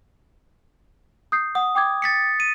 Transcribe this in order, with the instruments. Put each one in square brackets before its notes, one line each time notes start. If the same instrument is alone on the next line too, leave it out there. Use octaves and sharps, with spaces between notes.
[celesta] D#6 G6 C7
[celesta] F#5 [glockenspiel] D#6
[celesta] G5 D6 G#6
[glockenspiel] A6 B6 C#7
D#7